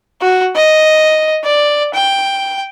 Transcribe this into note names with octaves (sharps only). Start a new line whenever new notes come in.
F#4
D#5
D5
G5